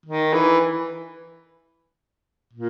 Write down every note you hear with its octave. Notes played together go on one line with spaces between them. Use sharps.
D#3
E3
A#2